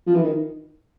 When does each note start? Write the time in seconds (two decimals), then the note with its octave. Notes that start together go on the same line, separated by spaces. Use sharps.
0.07 F3
0.15 E3
0.23 D#3